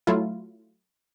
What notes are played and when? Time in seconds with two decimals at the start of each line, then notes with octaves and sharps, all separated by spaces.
0.07 F#3 A3 E4 F4